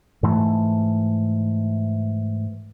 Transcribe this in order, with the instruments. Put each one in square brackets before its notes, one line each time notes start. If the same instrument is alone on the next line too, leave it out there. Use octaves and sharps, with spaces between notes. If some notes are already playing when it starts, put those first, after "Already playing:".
[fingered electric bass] G#2 E3 A3